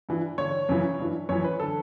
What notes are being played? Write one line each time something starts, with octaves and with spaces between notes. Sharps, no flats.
G2 E3
G2 D3 C#5
F#2 C#3 E3
G2 E3
F#2 E3 C#5
B4
D3 A4